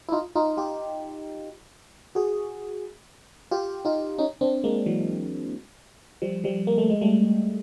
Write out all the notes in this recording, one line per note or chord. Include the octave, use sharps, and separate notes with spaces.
E4
D#4 F4
D#4 F4
F4 G4
F#4 G#4
F4 G4
D#4 F4
C#4 D#4
C4 D4
G#3 A#3
E3 F#3
F3 G3
F3 G3
A#3
A3
G#3
G3 A3